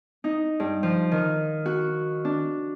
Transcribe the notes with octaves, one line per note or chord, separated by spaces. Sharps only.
D#4
G2
F3
D#3
F#4
D4